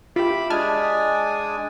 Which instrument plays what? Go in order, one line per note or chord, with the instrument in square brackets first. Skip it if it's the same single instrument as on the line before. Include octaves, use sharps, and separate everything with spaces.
[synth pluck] F4 G4 [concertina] E5 B5 D6
[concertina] G#3 D4 G#5 [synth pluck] A5 F6 G#6